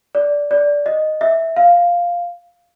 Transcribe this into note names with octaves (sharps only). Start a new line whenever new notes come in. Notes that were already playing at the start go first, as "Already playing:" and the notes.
D5
D5
D#5
E5
F5